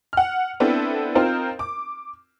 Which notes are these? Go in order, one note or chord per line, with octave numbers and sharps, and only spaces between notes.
F#5 F6
B3 C4 D4 E4 A4
C4 D#4 F4 A#4 C5
D6